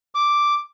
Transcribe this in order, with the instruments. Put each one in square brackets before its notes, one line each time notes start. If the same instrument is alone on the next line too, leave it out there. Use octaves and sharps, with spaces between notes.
[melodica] D6